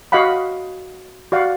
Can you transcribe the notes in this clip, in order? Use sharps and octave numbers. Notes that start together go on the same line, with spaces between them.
F#4 D#5 F5 F#5 B5
F#4 D5 F5 F#5